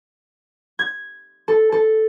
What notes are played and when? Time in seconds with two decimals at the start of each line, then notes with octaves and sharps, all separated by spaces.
0.79 G#6
1.48 A4
1.72 A4